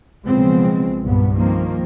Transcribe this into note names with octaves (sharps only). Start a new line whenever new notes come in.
B1 C#3 F3 G#3 B3 C4
C2 G2 A#2 B3
D#3 F3 A#3 C4